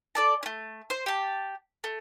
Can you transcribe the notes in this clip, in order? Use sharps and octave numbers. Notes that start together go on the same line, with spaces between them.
A4 D5 A5
A3 C#4
C5
G4 A5
A3